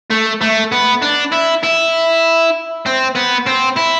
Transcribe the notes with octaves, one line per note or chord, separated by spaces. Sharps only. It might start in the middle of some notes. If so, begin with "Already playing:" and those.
A3
A3
B3
D4
E4
E4
C4
B3
C4
E4